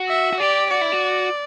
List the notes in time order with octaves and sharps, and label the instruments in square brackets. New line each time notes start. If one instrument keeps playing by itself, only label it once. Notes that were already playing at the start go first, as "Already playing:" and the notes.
Already playing: [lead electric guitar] F#4
[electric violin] E5
[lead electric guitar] F#4
[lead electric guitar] G4 [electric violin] D5
[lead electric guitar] F#4 [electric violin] D5
[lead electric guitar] E4
F#4